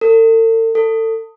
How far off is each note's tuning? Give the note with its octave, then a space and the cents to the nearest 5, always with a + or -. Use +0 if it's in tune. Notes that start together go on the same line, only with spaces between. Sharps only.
A4 +45
A4 +30